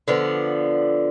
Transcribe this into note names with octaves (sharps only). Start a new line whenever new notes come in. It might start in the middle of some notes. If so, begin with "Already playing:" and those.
D3 F3 B3